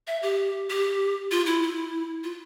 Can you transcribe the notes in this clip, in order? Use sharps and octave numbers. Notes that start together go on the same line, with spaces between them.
E5
G4
G4
F4
E4
E4
F4